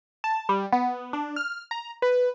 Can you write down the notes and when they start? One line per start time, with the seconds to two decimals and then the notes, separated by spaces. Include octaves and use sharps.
0.24 A5
0.49 G3
0.73 B3
1.13 D4
1.36 F6
1.71 A#5
2.02 B4